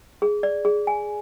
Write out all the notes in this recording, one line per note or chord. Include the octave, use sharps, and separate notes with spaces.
G#4
D5
G#4
G#5